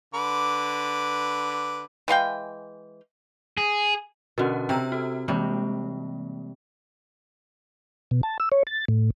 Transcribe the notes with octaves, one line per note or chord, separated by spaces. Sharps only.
D3 B4 D6
E3 G#3 F5 G5
G#4
B2 D3 C#4 F#4 A#4
C3 G5 A#5 E6
F#4 A4
C3 E3 G3 G#3 A#3
B2
A5
E6
C#5
A6
A2